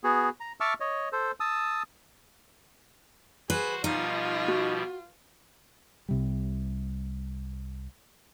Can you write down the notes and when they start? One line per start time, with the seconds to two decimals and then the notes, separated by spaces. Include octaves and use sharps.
0.04 B3 F#4 G#4
0.40 A#5
0.60 E5 A5 C#6 D6 E6 F6
0.80 C#5 D#5
1.12 A4 C5
1.40 A5 D#6 E6
3.50 F#4 G#4 B4 C5
3.84 B2 F3 G3 D#4 F4
4.48 F#4
6.09 C2 C3 G3